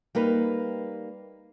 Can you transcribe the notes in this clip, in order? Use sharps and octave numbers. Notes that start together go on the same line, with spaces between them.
G3 A#3 D#4 B4